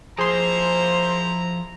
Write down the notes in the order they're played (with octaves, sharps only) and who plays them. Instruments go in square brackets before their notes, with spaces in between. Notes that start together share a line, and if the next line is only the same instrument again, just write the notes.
[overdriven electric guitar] F3 [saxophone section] A#3 C5 [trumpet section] E4 A#5 [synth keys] G#4 C6